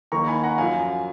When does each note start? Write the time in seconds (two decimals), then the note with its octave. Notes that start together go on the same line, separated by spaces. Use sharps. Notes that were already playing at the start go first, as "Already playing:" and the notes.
0.12 D#2 D#3 A#5 C#6
0.27 G#5 B5
0.44 F#5 A#5
0.58 F#2 F3 F5 G#5